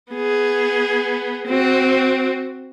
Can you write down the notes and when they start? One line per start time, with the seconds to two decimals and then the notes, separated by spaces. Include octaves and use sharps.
0.12 B3 G#4
1.46 C4 F#4